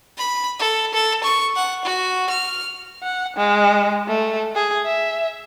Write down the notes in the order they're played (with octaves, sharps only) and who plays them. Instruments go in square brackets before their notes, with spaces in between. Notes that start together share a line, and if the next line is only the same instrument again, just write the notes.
[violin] B5
A4
A4
C#6
F#5
F#4
F6
[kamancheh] F#5
G#3
A3
G#4
E5